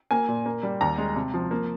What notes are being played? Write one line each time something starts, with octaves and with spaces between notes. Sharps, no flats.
A#3 G#5
A#2
A#3
G3
D#2 A#5
G#3
C3
F3
A#3